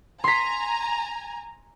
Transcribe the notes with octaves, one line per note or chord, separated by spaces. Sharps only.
G#5 A#5 C6 B6